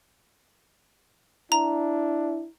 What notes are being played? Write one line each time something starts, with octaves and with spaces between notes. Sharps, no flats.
D4 E4 A#5